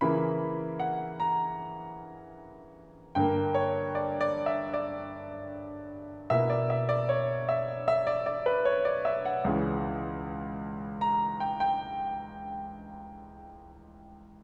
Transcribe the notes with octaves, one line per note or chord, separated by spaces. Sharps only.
C#3 E3 A#3 E4 B5
F#5
A#5
G2 D3 A#3 G5
C#5
D5
D5
E5
D5
B2 A#3 E4 E5
D5
E5
D5
C#5
E5
E5
D5
D5
B4
C#5
D5
E5
F#5
C#2 C#3 E3
A#5
G5
G5